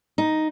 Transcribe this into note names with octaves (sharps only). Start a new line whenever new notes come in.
D#4